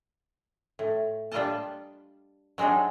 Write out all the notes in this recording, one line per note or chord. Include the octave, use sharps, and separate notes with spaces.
A2
G3 D4 F4 A#4 D#5 A5
F#3 G#3 C4 D4 D#4